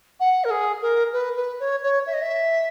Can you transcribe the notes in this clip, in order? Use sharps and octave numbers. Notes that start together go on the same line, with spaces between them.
F#5
A#4
G#4
A#4
B4
B4
C#5
C#5
E5
D#5
E5